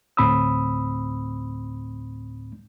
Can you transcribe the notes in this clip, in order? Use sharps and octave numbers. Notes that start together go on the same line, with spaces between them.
D2 A2 C4 B5 D#6 E6